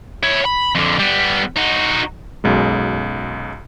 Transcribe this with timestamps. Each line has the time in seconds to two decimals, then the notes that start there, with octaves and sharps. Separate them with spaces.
0.23 E4 C#5
0.46 B5
0.75 F2 D3
0.99 G3 B3
1.56 D#4 F#4
2.44 B1 F#2 G#3